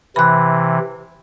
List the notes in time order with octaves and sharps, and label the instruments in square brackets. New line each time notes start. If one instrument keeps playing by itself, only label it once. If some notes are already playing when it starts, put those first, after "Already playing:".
[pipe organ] C3 E3 [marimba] B5 F#6